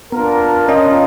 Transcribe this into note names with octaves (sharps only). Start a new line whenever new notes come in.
B3 D4 F4 A#4
C#4 F4 A#4 D#5